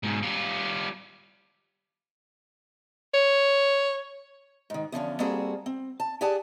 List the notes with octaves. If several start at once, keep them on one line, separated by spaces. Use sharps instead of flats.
G#2 B2
G3 F4
C#5
G#2 D#3
E2 D3 F3 C#4
G3 A#3 C4 F#4 G#4 A4
C4
A5
G4 G#4 D5 F#5 G#5 A5